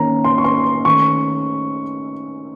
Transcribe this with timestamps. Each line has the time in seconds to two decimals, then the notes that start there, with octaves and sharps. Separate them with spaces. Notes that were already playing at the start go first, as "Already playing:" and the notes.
Already playing: D#3 A#3 C#4 A#5
0.24 C6
0.38 C#6
0.44 C6
0.85 D#3 A3 C#4 C#6